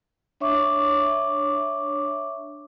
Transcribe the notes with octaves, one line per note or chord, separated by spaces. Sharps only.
D4 C#5 E5 C#6 D6